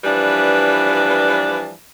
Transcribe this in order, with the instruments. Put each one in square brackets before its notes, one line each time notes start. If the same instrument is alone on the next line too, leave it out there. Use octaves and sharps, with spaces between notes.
[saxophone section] E3 F3 G3 D4 B4